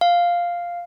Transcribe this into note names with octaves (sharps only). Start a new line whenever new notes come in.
F5